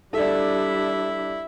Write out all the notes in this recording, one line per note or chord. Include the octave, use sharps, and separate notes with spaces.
G3 D4 E4 A4 D5 E5